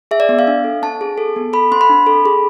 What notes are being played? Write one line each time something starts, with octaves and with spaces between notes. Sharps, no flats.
G#4 E5
D5
B3
F5
D4
A4
C4 A5
G#4
A4
B3
A4 B5
C4 C6
B5
D4
A4
G#4